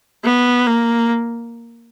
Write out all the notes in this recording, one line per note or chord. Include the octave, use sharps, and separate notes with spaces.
B3
A#3